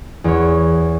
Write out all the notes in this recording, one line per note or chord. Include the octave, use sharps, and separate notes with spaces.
E2 C#5